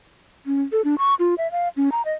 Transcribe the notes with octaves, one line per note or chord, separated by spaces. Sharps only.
C#4
A4
D4
C#6
F4
E5
F5
C#4
A#5
D#5